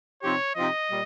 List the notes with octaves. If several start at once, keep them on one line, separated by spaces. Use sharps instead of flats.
C3 F3 C4 D#4 G4 C#5
C3 F3 C4 D#4 G4 D#5
A#2 G3